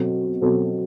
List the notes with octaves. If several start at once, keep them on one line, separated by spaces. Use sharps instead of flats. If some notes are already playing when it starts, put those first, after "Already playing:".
Already playing: B2 F#3 C4 F#4 A4
B2 F#3 C4 F#4 A4